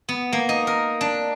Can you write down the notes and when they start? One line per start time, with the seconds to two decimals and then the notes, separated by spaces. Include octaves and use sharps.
0.09 B3
0.33 A#3
0.49 D#4
0.67 A#4
1.01 D4